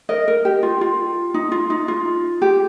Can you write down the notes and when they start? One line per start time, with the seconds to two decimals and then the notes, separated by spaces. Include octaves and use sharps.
0.09 A#4 D#5
0.28 A#4
0.45 G4
0.63 F4
0.81 F4
1.34 D#4
1.52 F4
1.70 D#4
1.88 F4
2.42 G4